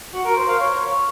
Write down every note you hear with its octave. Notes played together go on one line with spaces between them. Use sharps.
F#4
A#4
C5
F5
C#5